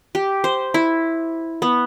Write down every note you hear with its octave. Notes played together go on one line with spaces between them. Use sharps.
G4
C5
E4
B3